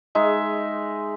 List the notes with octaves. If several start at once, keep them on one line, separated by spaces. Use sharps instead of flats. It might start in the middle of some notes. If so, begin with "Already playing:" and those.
G#3 D#4 G#4 E5